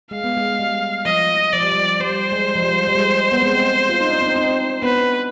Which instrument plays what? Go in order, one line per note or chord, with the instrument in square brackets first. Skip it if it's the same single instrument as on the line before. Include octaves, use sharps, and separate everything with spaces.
[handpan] G#3 [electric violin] F5
[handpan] B3
G#3
G3
[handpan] F3 [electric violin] D#5
[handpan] F3 [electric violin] D5
[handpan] G3
F3
[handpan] G3 [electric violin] C5
[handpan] G#3
F3
G3
G3
G#3
B3
G#3 C4
F4
D#4
D4
C4 D#4
C4 D#4
[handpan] B3 D4 [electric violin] B4